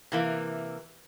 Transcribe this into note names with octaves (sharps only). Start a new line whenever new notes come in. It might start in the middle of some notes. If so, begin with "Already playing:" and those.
C3 E3 A#3